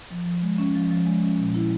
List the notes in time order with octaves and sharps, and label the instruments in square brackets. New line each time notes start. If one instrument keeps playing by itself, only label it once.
[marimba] F3
F3
G#3
C#4
F3
F3
G#3
C#4
A#2
E4